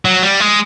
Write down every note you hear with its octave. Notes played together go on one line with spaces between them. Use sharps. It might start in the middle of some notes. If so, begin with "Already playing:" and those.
F#3
G3
G#3